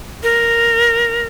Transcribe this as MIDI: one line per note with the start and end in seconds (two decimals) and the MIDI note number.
0.23 1.27 70